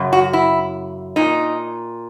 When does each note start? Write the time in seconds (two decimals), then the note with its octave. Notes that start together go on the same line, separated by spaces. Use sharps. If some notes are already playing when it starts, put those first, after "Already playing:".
Already playing: F#2 C#3
0.13 F#4
0.33 E4
1.16 A#2 D#4